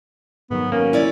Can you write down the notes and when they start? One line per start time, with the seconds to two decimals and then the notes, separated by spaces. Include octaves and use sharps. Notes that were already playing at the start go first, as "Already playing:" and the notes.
0.51 G#2 D#3 F#3 B3
0.72 A#3 C#4
0.93 E4 C#5 D5